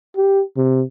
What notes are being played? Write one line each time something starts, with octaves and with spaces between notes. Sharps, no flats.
G4
C3